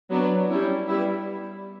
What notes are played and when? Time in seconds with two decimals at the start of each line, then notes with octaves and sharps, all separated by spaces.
0.10 F#3 B3 D4
0.49 G3 C#4 E4
0.87 G3 B3 E4